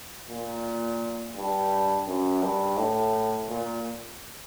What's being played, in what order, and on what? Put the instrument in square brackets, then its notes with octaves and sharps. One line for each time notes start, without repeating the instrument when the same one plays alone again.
[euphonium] A#2
G2
F#2
G2
A2
A#2